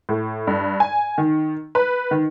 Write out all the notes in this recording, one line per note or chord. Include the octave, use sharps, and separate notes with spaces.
A2
G2
G#5
D#3
B4
D#3